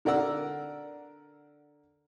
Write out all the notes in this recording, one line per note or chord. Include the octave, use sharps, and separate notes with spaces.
D3 A#4 D5 F#5 E6